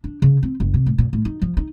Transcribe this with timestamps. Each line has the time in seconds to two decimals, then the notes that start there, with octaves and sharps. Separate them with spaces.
0.04 D4
0.22 C#3
0.43 C4
0.60 F#1
0.74 C3
0.86 A2
0.98 A#2
1.13 A2
1.25 D#4
1.42 F3
1.57 D#4